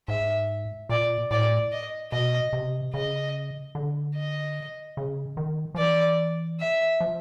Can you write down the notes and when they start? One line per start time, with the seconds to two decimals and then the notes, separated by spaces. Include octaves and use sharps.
0.08 G#2 E5
0.89 A#2 D5
1.31 A2 D5
1.72 D#5
2.12 B2 D#5
2.53 C3
2.94 C#3 D#5
3.75 D3
4.16 D#5
4.97 C#3
5.37 D#3
5.75 F3
5.78 E3 D5
6.60 E5
7.01 F3